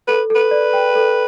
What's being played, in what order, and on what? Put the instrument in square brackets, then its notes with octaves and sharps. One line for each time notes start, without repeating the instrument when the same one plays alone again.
[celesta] A4 [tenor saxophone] B4
[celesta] A4
[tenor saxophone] B4
[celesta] D5
G5
A4